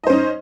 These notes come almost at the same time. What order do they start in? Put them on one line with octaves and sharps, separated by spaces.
D#5 C5 C#4 D#4